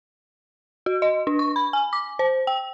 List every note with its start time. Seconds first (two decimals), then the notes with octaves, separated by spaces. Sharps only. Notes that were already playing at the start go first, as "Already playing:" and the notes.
0.86 F#4
1.02 D#5
1.27 D4
1.39 C#6
1.56 B5
1.73 G#5
1.93 D6
2.19 C5
2.47 G5